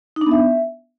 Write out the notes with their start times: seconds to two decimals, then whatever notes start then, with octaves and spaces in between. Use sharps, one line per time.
0.16 D#4
0.21 D4
0.26 B3
0.31 E5